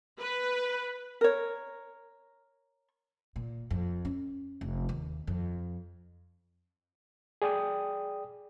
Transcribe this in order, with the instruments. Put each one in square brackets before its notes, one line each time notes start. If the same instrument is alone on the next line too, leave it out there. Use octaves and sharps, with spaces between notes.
[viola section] B4
[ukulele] A#4 C#5
[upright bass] A#2
F2
C#4
F1
D#2
F2
[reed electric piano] G#4 D5 G5 D#6